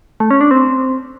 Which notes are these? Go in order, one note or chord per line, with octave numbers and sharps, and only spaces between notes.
A3
C#4
D4
C4